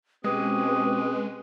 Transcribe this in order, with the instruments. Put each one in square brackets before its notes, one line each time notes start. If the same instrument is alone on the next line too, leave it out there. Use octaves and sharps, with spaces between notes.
[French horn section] B2 C4 [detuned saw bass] G#3 [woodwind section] C#4 G4 D#6 [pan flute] B4